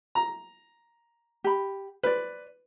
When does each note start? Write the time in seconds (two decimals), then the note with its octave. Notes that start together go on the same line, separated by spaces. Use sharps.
0.15 A#5
1.44 G4 B5
2.03 B4 C5 D5